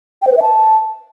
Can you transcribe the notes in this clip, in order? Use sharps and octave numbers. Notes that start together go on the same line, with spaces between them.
G5
C5
B4
E5
A5